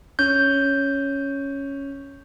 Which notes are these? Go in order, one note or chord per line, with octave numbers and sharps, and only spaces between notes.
C#4 G6